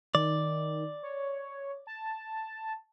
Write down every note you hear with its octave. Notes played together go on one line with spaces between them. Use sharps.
D#3 D5
C#5
A5